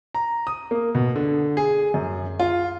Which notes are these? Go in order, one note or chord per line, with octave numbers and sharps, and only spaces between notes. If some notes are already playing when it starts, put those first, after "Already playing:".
A#5
D#6
A#3
B2
D3
G#4
F#2
F4